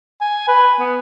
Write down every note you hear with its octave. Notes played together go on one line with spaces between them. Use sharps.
G#5
B4
B3